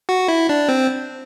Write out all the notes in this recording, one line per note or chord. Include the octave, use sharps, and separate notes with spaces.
F#4
E4
D4
C4